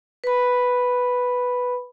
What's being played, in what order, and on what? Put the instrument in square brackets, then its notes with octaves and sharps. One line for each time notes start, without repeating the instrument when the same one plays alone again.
[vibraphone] B4 B5